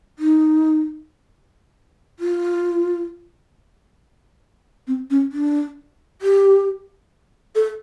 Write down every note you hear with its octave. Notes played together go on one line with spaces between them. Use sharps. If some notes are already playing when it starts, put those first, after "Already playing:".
D#4
F4
C4
C#4
D4
G4
A4